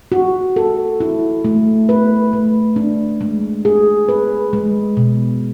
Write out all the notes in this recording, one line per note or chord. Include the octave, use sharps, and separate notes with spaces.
F#4
A4
E4
A3
B4
A3
D4
G#3
G#4
B4
G#3
B2